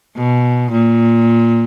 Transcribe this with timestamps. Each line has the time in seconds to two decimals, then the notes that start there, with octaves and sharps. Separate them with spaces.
0.16 B2
0.71 A#2